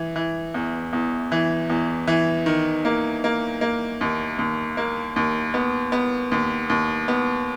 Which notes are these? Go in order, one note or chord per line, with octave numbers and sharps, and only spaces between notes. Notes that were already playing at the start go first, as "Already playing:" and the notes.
Already playing: E3
E3
E2
E2
E3
E2
E3
D#3
A#3
A#3
A#3
D#2
D#2
A#3
D#2
B3
B3
D#2
D#2
B3